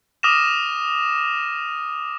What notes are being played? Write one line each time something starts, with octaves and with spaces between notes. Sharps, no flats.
D6 D#6 F6 A#6 D#7 E7